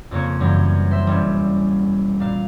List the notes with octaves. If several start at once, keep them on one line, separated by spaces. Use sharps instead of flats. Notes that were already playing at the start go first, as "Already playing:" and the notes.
F2 C#3 A#3 C#5
F#2 E3 G3
C5 E5
E1 G3 C#4
A#2 F5